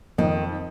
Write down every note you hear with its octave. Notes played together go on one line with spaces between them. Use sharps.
F2 D#3